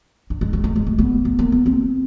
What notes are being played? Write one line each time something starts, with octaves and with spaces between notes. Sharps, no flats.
D4
G#3
G#3
A3
G#3
A3
B3
A3
A#3
B3
C4